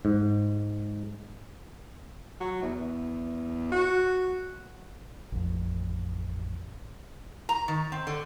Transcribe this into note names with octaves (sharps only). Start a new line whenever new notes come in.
G#2
F#3
E2
F#4
A1 F2
A#5
D#3
C4
D3